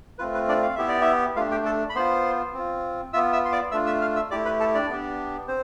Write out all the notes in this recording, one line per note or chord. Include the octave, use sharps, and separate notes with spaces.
A3 C4 F4 B4
B4
D4 D5
F5
B3 E4 G4 E5
D5
E4 E5
A3 D4 F4 G4 F5
G4 G5
A4 A5
B5
B3 F4 C5 C6
C4 F4
B3 F4 E5 E6
E5 E6
C6
D5 D6
A3 D4 F4 E5 E6
E5 E6
F5 F6
E5 E6
A3 E4 G4 D5 D6
B4 B5
A4 A5
D4 D5
B3 D4 G4
C4 C5